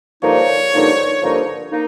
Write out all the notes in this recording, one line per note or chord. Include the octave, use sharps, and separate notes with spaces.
G2 D3 F3 A#3 D#4 C#5
G2 D3 F3 A#3 D#4
G2 D3 F3 A#3 D#4
A#3 D#4